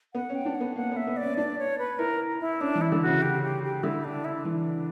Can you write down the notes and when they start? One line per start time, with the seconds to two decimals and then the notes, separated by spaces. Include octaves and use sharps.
0.14 B3 F#5
0.30 C#4
0.35 G5
0.45 D4
0.55 F#5
0.60 B3
0.76 A#3 F#5
0.91 B3
0.96 E5
1.07 B3
1.17 D5
1.23 C#4
1.37 D4 D5
1.59 C#5
1.78 B4
1.99 E4 A#4
2.40 E4
2.60 C#4 D4
2.75 E3
2.81 E4
2.92 D3
3.02 F#4
3.07 C#3
3.22 G4
3.43 G4
3.63 G4
3.83 D3 E4
4.04 D4
4.25 E4
4.45 E3 D4